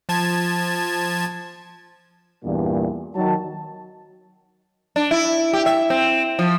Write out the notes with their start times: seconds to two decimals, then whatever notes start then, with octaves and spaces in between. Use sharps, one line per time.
0.09 F3 A5 G#6
2.45 E2 G2 A#2
3.16 D#3 F#3 A5
4.96 D4
5.11 E4
5.53 G4
5.66 E5
5.90 C4
6.39 F3